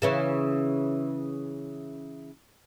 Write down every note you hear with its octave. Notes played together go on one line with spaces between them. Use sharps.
C#3 E3 C#4